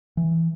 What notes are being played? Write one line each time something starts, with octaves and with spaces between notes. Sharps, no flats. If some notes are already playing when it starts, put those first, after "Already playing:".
E3